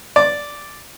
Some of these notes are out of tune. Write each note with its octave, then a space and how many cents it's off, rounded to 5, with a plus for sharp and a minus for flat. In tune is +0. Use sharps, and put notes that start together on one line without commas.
D5 -5